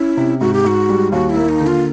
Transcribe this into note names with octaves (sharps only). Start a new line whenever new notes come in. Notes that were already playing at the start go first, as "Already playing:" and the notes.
Already playing: C#4 E4
C3
G#2 F#4
G4
G#2 F#4
G3
D#2 F#4
E4
A#3
D#4
D3
F4